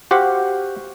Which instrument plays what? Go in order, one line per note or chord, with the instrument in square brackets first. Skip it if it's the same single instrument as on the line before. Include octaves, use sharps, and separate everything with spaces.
[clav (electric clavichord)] F#4 G4 C5 F5 F#5